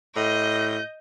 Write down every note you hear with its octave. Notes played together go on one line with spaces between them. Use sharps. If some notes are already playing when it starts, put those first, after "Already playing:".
A2 D#5 G6